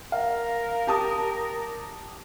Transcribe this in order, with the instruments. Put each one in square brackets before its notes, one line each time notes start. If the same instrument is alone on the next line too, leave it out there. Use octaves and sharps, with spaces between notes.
[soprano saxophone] A#4 [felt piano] F5
[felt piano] G4 A5 D#6